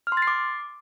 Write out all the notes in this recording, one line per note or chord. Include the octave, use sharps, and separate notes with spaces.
F6
C6
A6
C7
D6